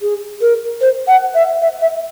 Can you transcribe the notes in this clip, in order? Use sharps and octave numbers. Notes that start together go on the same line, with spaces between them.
G#4
A#4
C5
F#5
E5
E5
E5